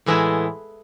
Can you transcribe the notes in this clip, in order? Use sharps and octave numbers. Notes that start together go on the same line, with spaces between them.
A2 E3 G#3 B3 E4